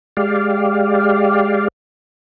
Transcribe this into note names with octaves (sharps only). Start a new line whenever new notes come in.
G#3 G4 D5 F5